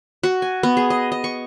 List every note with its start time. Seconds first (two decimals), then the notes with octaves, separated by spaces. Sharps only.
0.23 F#4
0.42 G#5
0.63 B3
0.77 G#4
0.90 D#5
1.12 D#5
1.24 C#6